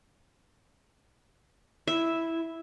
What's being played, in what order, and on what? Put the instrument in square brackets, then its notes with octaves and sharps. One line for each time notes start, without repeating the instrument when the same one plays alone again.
[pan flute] E4 [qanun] E5